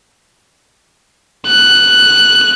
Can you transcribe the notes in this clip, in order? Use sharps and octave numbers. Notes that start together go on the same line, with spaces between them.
F#6